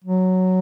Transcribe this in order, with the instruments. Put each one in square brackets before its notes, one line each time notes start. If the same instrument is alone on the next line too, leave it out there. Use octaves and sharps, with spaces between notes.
[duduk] F#3